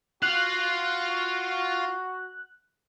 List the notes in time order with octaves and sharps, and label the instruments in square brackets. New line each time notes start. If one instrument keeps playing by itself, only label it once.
[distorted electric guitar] F4 F5 [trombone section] F#4 [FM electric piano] F#6